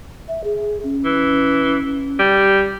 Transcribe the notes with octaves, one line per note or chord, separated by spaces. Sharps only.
E5
G#4
C#4
E3
G3